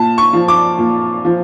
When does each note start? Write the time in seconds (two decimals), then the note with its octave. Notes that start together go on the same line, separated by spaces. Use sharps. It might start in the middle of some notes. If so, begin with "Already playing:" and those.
Already playing: A#2 A5
0.18 C#6
0.33 F3
0.48 D6
0.78 A#2
1.25 F3